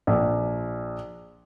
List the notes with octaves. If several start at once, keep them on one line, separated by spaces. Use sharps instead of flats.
A#1